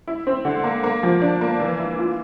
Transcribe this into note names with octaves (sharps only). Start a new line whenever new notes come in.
E4
C4
D3
A#3
A#3
F3
D4
A#3
E3
E4
F4